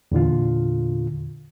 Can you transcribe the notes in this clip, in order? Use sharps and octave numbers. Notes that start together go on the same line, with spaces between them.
E2 A#2 D3 F4